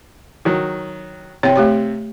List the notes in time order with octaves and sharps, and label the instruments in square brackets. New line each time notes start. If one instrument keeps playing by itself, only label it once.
[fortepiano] D#3 F#3
[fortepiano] C3 [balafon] C#5 G5
[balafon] A3 G4 C#5